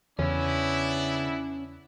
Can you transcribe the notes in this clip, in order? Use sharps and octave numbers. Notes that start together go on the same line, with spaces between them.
E2 C#3 B3 C#4 D4 E4